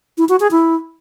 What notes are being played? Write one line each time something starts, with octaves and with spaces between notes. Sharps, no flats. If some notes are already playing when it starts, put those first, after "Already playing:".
E4
F#4
G#4
E4